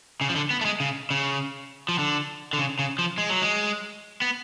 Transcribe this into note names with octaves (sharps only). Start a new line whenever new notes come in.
C#3
F3
D3
B3
A3
G#3
C#3
C#3
F3
D3
D3
C#3
C#3
F3
G#3
F#3
G#3
B3